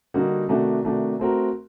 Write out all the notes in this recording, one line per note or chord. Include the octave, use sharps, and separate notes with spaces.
D3 G3 A#3 D#4 F#4
C3 D#3 A3 D4 F#4
C3 D#3 A3 D4 F#4
A3 C4 F#4 A#4